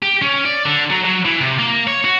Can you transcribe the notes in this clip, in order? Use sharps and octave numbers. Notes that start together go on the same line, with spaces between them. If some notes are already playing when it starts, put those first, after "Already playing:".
G4
C#4
D5
D3
F#3
F#3
E3
C3
A#3
C#5
F#4